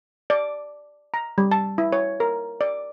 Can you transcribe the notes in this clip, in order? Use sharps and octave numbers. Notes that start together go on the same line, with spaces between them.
D5
A#5
G3
A5
E4
C#5
A#4
D5